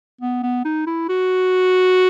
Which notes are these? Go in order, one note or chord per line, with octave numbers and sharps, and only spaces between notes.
B3
B3
D#4
E4
F#4